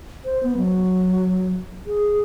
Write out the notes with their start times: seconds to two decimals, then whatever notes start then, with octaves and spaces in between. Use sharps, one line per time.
0.25 C5
0.43 B3
0.57 F#3
1.87 G#4